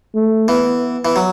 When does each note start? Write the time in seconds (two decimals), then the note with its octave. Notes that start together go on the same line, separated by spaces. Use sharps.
0.15 A3
0.48 E3 B3
1.05 E3
1.16 F#3